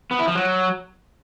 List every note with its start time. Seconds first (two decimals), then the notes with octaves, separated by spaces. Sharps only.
0.11 B3
0.19 E4
0.27 F3
0.35 F#3